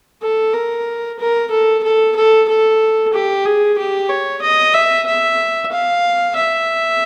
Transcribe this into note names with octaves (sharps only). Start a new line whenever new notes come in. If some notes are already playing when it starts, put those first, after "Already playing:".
A4
A#4
A#4
A4
A4
A4
A4
G4
G#4
G4
C#5
D#5
E5
E5
F5
E5